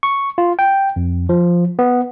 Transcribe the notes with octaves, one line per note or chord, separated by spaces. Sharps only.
C#6
F4
G5
F2
F3
B3